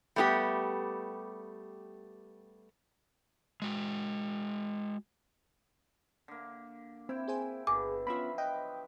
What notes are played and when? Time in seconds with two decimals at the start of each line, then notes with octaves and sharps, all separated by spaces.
0.16 G3 A3 B3 F#4 G4
3.62 G#3 F#4
6.28 D3 A#3
7.09 C4 E4 G5
7.28 G#4 C5 G#5
7.67 G1 B2 D3 G#4 D6
8.07 F3 F#3 B3 C#4 F4 E5 B5
8.38 B4 D#5 G5